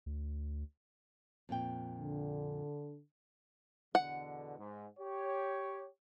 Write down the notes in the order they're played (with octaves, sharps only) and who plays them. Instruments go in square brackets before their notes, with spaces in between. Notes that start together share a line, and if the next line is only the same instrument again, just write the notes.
[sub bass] D2
[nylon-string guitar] F2 A#2 G5
[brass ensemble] D3
[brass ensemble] E2 B2 D3 [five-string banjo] F#5
[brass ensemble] G#2
G4 C#5